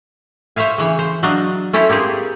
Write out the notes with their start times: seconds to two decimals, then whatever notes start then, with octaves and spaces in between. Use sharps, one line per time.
0.56 C5 C#5 E5 F5 G#5
0.78 C#3 E3 C#5
0.99 C5
1.23 F#3 D4 D#5 F5
1.73 C#4 E4 A4 C5 C#5
1.89 A#3 C4 G4 G#4